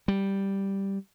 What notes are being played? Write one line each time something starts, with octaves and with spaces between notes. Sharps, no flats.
G3